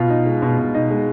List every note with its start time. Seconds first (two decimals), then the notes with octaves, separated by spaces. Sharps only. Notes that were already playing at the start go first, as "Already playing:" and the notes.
Already playing: B2 F4
0.10 D#4
0.26 G#3
0.42 B2
0.58 B2
0.74 D#4
0.91 G#3